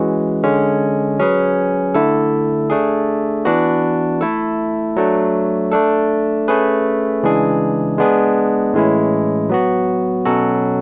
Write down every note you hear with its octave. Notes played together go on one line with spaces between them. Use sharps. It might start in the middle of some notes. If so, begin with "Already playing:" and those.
Already playing: E3 G#3 C#4 F#4
D3 G#3 C#4
F#3 C#4 G#4 B4
D3 A3 E4 A4
A3 D4 G#4
E3 B3 D4 F#4 B4
A3 E4 A4
F#3 A3 D4
A3 D4 A4
A3 C#4 G#4 B4
C#3 E3 G#3 D4 G#4
G#3 B3 D4 G#4
A2 E3 G#3 C#4 E4
F#3 B3 F#4
B2 F#3 C#4 F#4 A4